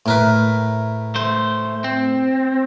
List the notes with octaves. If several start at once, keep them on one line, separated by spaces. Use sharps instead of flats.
A2 A#4 B4
A3 C5
C4